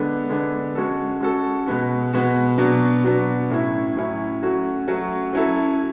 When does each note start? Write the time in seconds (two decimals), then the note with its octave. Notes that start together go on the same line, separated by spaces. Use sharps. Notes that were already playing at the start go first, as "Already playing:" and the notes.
Already playing: D3 G#3 B3 D4
0.29 D3 G#3 B3 D4
0.75 G#3 C#4 F#4 A4
1.21 G#3 C#4 F#4 A4
1.66 B2 G#3 B3 F#4
2.13 B2 G#3 B3 F#4
2.58 B2 F#3 B3 D4
3.04 B2 F#3 B3 D4
3.50 A2 F#3 C#4 E4
3.95 A2 F#3 C#4 E4
4.42 F#3 A3 C#4 F#4
4.88 F#3 A3 C#4 F#4
5.33 F#3 C#4 E4 A4